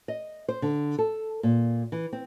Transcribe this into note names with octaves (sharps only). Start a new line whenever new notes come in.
D#5
C5
D3
A4
A#2
E3
C4